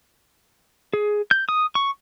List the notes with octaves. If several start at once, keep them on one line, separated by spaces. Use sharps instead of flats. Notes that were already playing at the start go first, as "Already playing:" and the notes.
G#4
G6
D#6
C#6